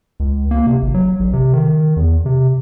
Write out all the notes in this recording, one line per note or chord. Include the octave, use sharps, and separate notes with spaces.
C#2
A#3
C3
G#1
F#3
A1
C3
D#3
E2
C3